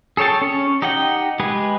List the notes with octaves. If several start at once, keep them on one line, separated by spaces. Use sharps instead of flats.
G#4 A4 C#5 G5 A5
C#4 C#5
D#4 G4 D#5 F#5 G5
G#3 G4 G#4 B4